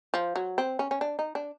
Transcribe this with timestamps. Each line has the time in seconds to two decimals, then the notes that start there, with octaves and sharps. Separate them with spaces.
0.14 F3
0.36 F#3
0.58 C4
0.79 C#4
0.91 C#4
1.01 D4
1.19 D#4
1.35 D4